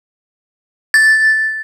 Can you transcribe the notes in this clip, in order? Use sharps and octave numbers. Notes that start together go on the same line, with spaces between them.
A6